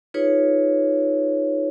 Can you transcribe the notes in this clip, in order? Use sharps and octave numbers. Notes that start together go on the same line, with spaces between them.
D#4 F4 G#4 B4 C#5